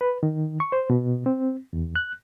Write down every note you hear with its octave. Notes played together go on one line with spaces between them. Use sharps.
B4
D#3
C#6
C5
B2
C4
E2
F#6